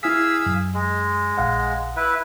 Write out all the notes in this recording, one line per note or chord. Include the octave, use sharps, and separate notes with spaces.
E4 G#4 F5 E6 B6
F#2
G#3
A#1 F5 F#5
E4 B4